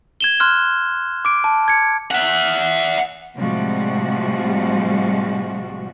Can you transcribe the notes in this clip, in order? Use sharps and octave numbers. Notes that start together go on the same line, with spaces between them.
G#6 E7 G7
C6 F6 F#6
D6 D7
A5
G#6 C#7
E5 F#5
A2 C3 F3 G3 G#3 F#4